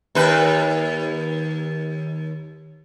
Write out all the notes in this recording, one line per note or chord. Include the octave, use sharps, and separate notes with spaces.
D#2 B4